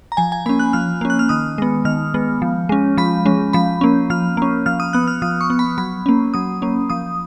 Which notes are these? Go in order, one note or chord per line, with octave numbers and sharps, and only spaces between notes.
A#5
F3 G#5
G#5
A#3 C#4 B5
F#6
F3 F6
A#3 C#4
F#6
F6
D#3 D#6
G#3 B3
D#3 F6
G#3 B3
F3
G#3 C#4
F3 B5
G#3 C#4
F3 B5
A#3 C#4
F3 F6
A#3 C#4
F3 F6
D#6
B3 F#6
F6
F3 D#6
C#6
B3
B5
F#3 B5
A#3 C#4
F#3 D#6
A#3 C#4
F3 D#6